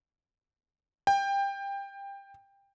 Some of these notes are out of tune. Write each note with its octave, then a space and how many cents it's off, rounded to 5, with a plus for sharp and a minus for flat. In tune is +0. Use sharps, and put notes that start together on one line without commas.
G5 +20